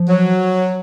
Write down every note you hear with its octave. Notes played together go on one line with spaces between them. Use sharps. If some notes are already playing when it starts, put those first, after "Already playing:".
Already playing: F3
F#3